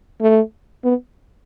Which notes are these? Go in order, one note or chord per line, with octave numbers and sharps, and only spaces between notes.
A3
B3